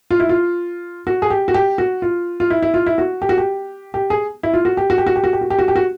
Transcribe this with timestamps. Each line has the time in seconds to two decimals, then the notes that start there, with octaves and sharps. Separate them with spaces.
0.11 F4
0.20 E4
0.29 F4
1.07 F#4
1.22 G#4
1.30 G4
1.48 F#4
1.54 G4
1.78 F#4
2.02 F4
2.40 F4
2.50 E4
2.62 E4
2.74 F4
2.86 E4
2.98 F#4
3.22 G4
3.29 F#4
3.38 G4
3.94 G4
4.10 G#4
4.43 E4
4.53 F4
4.65 F#4
4.77 G4
4.90 F#4
4.98 G4
5.07 F#4
5.16 G4
5.24 F#4
5.33 G4
5.41 F#4
5.50 G4
5.59 F#4
5.68 G4
5.76 F#4